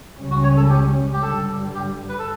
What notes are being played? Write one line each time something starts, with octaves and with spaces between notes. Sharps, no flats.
C#2 C#3 G3 C#4
F#4
C#5
A4
G4
G4
G2 D3 G3 A4
G4
B4
A4